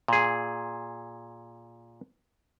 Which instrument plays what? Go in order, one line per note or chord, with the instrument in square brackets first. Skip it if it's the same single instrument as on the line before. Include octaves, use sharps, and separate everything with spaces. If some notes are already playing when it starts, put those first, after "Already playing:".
[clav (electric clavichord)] A#2 G#4